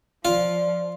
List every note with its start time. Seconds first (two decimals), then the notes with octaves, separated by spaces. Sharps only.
0.25 F3 F4 D5